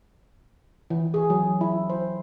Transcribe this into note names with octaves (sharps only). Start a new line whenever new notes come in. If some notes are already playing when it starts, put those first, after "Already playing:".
E3
G#4
F#3
E4
C5